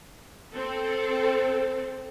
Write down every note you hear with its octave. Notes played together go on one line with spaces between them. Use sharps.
C4 A4